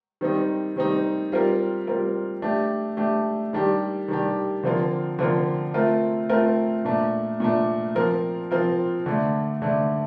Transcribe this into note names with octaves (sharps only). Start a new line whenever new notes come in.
D#3 G3 C4 D#4
D#3 G3 C4 D#4
G3 C4 F4 A#4
G3 C4 F4 A#4
A3 D4 G4
A3 D4 G4
D#3 G3 D4 G4
D#3 G3 D4 G4
D3 F3 C4 F4 A#4
D3 F3 C4 F4 A#4
A3 C4 F4 A#4
A3 C4 F4 A#4
A#2 A3 D4
A#2 A3 D4
F3 C4 F4 A#4
F3 C4 F4 A#4
D3 A3 D4
D3 A3 D4